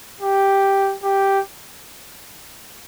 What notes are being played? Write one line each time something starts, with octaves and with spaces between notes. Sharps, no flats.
G4
G4